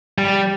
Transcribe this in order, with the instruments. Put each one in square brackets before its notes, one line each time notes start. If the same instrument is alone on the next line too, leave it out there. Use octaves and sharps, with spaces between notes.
[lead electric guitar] G3